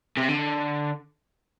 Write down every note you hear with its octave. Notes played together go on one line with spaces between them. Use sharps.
C3
D3